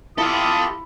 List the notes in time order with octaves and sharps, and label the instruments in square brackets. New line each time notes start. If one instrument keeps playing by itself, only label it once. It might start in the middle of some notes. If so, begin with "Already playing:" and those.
[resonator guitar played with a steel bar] E4 [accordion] F4 G4 E5 [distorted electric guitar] A4 F5 [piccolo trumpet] D#6